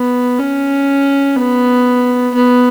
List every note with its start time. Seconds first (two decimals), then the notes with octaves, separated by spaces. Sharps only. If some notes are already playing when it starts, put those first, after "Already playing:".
Already playing: B3
0.39 C#4
1.37 B3
2.34 B3